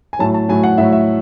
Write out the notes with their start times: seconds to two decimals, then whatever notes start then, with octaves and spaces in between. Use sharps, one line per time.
0.13 G#5
0.19 A2 F#3 A5
0.34 A5
0.49 A2 F#3 G#5
0.63 F#5
0.78 A2 F#3 E5
0.92 E5